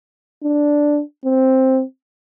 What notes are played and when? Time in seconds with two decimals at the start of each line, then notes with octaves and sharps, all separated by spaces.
0.43 D4
1.25 C4